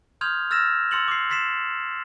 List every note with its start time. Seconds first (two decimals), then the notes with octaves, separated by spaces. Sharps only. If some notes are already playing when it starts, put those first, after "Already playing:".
0.21 C6 D#6 F6 G6 G#6 F7
0.51 E6 F6 A6 A#6 E7
0.91 C6 E6 A6 C#7 F7 F#7
1.08 D6 C7
1.30 C6 A6 B6 C7 E7